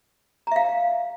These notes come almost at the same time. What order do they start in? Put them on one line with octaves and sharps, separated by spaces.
A#5 E5 F5